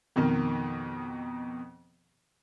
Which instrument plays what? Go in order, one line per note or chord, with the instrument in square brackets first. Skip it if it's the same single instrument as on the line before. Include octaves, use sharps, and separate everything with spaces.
[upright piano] F2 B2 D#3